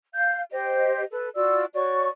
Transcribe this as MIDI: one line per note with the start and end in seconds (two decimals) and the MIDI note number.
0.14 0.42 77
0.14 0.42 91
0.51 1.03 67
0.51 1.03 72
0.51 1.03 75
1.11 1.29 69
1.11 1.29 71
1.35 1.64 65
1.35 1.64 66
1.35 1.64 74
1.35 1.64 88
1.73 2.08 66
1.73 2.08 73
1.73 2.08 74
1.73 2.08 85